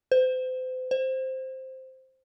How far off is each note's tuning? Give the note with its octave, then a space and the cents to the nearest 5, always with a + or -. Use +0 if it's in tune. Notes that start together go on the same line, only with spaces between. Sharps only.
C5 -35
C5 +0